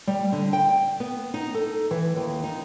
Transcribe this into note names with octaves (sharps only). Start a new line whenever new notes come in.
G3
D3
G5
B3
D#4
A4
E3
D#2
D#4